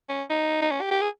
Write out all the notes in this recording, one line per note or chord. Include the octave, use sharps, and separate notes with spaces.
C#4
D#4
D#4
C#4
G4
G4
G#4